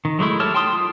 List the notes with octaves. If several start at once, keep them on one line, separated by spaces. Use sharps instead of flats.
D#3
F#3 G#3 A3 E4
G4 A4 C#5 A5 F6
G5 A5 C6 D#6
F4